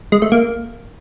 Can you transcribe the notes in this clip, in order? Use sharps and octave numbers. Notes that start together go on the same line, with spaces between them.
G#3
A3
A#3